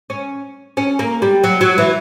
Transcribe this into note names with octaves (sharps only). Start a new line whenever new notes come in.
C#4
C#4
A#3
G3
F#3
F#3
E3